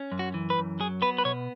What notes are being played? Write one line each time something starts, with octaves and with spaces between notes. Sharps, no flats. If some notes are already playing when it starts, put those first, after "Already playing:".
Already playing: C#4
F#2
F#4
E3
B4
F#2
F#3 G#4
B3 B4
B4
B2 C#5